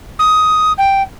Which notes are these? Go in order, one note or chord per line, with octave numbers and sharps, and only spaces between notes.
D#6
G5